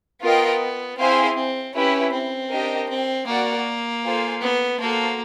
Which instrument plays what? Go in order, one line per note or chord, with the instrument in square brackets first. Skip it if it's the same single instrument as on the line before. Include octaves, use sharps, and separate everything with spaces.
[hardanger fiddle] B3 [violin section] F4 A#4 D#5 G5
[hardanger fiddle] C4 [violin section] E4 G#4 C5 F5 G#5
[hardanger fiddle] C4
[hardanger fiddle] C#4 [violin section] E4 G4 B4
[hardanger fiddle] C4
[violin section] D4 G4 A#4 D#5
[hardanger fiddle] C4
[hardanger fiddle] A#3 [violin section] F#4 A#4 D5 F#5
[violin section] F4 A4 C5 F5 G#5
[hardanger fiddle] B3
[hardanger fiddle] A#3 [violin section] F#4 A4 C5 F5 A5